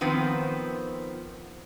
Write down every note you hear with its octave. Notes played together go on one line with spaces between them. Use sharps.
D#3 F3 B3 C4